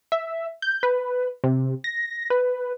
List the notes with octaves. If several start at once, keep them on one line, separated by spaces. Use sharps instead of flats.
E5
G6
B4
C3
A#6
B4